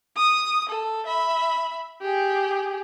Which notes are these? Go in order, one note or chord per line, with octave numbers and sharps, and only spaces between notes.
D#6
A4
E5 B5
G4 G#4